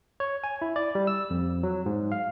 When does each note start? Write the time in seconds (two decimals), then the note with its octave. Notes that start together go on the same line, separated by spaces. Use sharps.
0.20 C#5
0.44 G#5
0.62 E4
0.76 D5
0.95 G3
1.07 E6
1.30 F2
1.63 F#3
1.86 G#2
2.12 F5